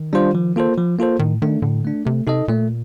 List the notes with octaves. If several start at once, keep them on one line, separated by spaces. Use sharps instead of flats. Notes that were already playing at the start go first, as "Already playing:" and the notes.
Already playing: D#3
G3 D4 F4 C5
F3
A#3 F4 A4 C5
F3
A#3 F4 A4 C5
A2 D#3
D#3 A3 D4
A2 D3
A3 D4
C3 A3
C3 D#4 A4 D#5
A#2 A3